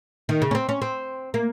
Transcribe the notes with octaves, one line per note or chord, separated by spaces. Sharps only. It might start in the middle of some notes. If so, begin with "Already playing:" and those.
D#3
C#3
C#4
C4
C#4
C4
A#3